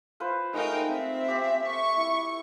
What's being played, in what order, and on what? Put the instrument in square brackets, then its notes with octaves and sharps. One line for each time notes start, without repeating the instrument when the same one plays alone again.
[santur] F4 B4 C5
[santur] G#3 A3 F5 [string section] D#4 A#4 G5
[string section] C4 [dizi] E5
[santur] G4
[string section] C#6
[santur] E4